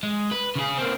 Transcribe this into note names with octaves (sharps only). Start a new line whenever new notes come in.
G#3
B4
C#3 G#4
A#3 C4